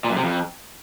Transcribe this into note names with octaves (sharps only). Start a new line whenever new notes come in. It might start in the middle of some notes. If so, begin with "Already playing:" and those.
A#2
F#2
C3
F2